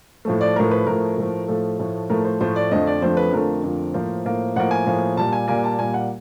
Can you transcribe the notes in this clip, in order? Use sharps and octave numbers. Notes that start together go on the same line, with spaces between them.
A2 F3 A3
D5
A2 F3 A3 A#4
B4
A2 F3 A3 A#4
A2 F3 A3
A2 F3 A3 A4
A2 F3 A3
A2 F3 A3 A#4
C5
A2 F3 A3 C5
D5
F2 D3 F3 A3 D#5
D5
F2 D3 F3 A3 C5
B4
F2 D3 F3 A3 A#4
F2 D3 F3 A3
A2 F3 A#3 C5
A2 F3 A#3
A2 F3 A#3 F#5
G#5
A2 F3 A#3
A#2 G3 A#3 A5
G#5
A#2 G3 A#3 G#5
A5
A#2 G3 A#3 G#5
F#5